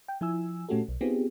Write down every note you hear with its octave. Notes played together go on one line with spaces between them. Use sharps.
G5
F3 E4 G#5 E6
A#2 A3 C#4 F#4 G4 A4
B1
B3 C4 D#4 F4 G4 G#4